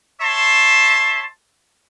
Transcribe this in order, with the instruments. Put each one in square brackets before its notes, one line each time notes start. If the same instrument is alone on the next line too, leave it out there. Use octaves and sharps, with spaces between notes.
[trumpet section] C#5 E5 A5 C6